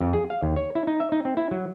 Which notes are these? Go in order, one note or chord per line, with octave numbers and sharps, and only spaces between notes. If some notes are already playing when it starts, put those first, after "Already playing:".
F2
G#4
F5
D#2
C#5
E4
D#4
E5
D#4
C4
E4
F#3